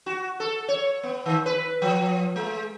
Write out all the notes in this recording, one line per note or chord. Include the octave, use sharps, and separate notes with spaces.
F#4
A4
C#5
B3
D#3
B4
F3
G#3